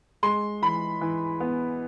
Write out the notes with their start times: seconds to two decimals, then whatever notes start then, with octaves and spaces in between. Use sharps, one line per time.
0.23 G#3 C6
0.62 E3 B5
1.01 E3
1.40 B3